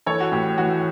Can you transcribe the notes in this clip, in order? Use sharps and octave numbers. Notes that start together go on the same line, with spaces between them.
E3 A4 C#5
F#4
A2 G4
E3 F#4